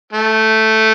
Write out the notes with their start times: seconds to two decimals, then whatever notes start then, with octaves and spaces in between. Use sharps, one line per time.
0.13 A3